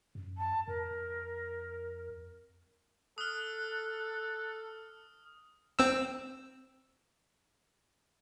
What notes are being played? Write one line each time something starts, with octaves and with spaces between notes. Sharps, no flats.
F#2
A5
F2 A#4
A4 D#6 F6 F#6
C4 E6